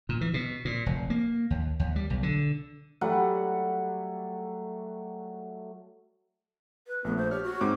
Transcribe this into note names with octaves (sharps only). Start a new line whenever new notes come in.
A#2
E3
B2
A#2
F1
A#3
D#2
D#2
G3
B1
D3
F#3 G3 A3 F#5
B4
A#1 A3 B3
C5
G4 C#5 F6
F#4
G#2 C4 D6